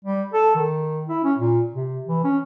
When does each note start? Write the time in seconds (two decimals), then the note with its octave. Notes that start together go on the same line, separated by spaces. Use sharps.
0.04 G3
0.33 A4
0.55 D#3
1.08 E4
1.24 C#4
1.38 A#2
1.73 C3
2.07 E3
2.24 C#4